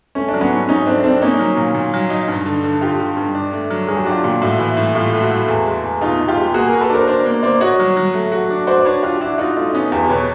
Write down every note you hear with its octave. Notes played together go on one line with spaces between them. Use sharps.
A3 C#4
D4
F#3
B3 C#4
G#2
G#2 C#4 D#4
A3 C4 D4
G#2 C4 D4
A#3 C#4 D#4
F#3
A#2
A#2
F#3
D#4
G2
D3
D3
D3 F4 G4
D3
G2
D4
A3
F#3
F#3 G#4
G4
F#4
D4 F4 G4
A#2
A2 E4 F#4
E3
A2
A2 F4 G4
A3
E4 F#4
A3
E2
G#3
E2
B2 D#4 F4
B2
F4 G4
G#3
A#3 F#4 G#4
G#4 A#4
F#4
A4 B4
D4 A#4 C5
D4 A#4 C5
A#3
A#3 C5 D5
F#4 C#5 D#5
F#3
F#3
A3
F#4
D4
F#4 C5 D5
D5
D4 B4 C#5
D4 F4 G4
D4 E4 F#4
D#4 F4 F#4
A3 D#4 F4
B3 C#4 D#4
E2 F4 G4
B2 B4 C#5